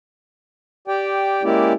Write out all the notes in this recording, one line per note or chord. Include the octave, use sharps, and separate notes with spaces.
G4 D5 G5
G#3 A#3 C#4 E4 G4 D5